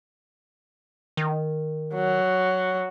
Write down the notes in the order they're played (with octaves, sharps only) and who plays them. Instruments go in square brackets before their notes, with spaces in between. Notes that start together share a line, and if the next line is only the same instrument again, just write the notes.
[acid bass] D#3
[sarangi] F#3